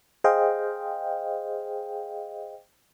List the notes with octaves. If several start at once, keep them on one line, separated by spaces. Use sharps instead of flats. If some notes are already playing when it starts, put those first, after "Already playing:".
G#4 C5 D#5 F5 G5